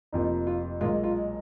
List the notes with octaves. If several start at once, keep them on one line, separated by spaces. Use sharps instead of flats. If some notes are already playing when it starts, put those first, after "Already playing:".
F1 F2 F3 A#3 D#4
F4
B1 A#2 G#3 F4
F4